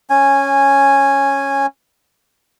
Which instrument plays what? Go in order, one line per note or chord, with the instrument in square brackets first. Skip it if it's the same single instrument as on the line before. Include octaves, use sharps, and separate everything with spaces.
[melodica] C#4 G#5